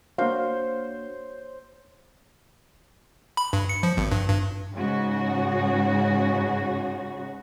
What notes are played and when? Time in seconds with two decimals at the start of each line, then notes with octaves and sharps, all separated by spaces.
0.18 A#3 D4 F#4 C5 C#5 F5
3.37 B5
3.53 G2
3.69 C#7
3.83 F3
3.97 G#1
4.11 G2
4.29 G2
4.75 G#2 C#3 F#4